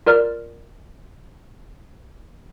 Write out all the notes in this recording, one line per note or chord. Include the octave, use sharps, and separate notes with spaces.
F4 A#4 D5 F6